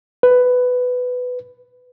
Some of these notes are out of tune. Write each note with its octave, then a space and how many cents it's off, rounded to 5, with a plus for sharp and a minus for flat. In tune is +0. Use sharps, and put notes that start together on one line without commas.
B4 +10